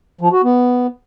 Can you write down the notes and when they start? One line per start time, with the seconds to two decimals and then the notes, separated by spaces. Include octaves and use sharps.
0.21 F3
0.32 F#4
0.44 B3